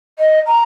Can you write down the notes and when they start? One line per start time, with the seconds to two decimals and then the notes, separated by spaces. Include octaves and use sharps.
0.19 D#5
0.46 A#5